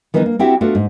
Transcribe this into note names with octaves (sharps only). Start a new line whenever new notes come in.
D#3 E3 G3 B3 D4 D#4
A#3
C4 E4 F#4 G4 E5 F#5
A3 B3 D4 F4 F#4
G#2